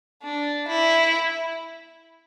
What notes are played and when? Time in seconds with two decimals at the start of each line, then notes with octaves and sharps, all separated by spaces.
0.23 D4
0.68 E4